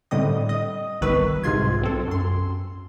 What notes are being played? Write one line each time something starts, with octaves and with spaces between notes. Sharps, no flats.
A2 D3 G3 C4 D#5 D#6
D#5 D#6
G1 C2 D#3 B4 C#6 E6
C2 G#2 C3 F4 C6 G#6
B1 C4 A4
F#2 C6